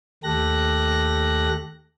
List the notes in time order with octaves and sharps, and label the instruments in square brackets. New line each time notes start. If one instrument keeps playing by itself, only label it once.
[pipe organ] D#2 A3 G4 A4 F#6 A#6